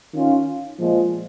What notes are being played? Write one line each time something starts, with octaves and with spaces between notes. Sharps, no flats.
D#3 C#4 F4
A#2 F3 G#3